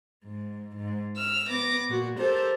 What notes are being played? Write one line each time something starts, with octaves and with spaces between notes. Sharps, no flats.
G#2
G#2
E6 F6
B3 D6 A#6
A#2 F#4
G4 A4 A#4 C5